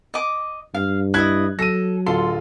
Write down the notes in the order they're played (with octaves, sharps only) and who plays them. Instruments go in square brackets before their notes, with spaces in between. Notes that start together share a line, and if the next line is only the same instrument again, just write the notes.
[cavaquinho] D#5 D6
[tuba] G2 [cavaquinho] F5
[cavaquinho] E4 D#5 [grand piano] F#6 G#6
[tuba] F#3 [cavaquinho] A4 [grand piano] A#6 D#7
[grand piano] D1 F4 A4 [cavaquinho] C6